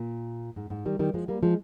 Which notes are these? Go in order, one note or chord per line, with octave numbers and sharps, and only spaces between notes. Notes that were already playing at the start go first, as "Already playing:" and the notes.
Already playing: A#2
G#2
G#2
D#3 G3
D#3 G3
F3 G#3
G3 A#3
F3 G#3